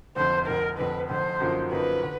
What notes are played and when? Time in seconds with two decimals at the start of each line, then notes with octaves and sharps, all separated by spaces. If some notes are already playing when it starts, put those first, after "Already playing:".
0.16 F1 F2 D3 C5
0.47 F1 F2 D3 A#4
0.79 F1 F2 D3 B4
1.10 F1 F2 D3 C5
1.40 F#2 D3 F3 A#3 D#4
1.71 F#2 D3 F3 A#3 D#4 B4
2.03 D3